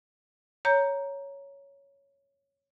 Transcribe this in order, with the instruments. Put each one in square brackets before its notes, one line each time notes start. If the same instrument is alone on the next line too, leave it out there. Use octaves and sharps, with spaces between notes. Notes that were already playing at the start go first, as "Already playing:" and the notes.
[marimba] C#5 A#5 G6